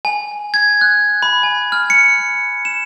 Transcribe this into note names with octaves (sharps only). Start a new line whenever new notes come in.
G#5
G#6
F#6
B5
G#5
F6
C#7
E7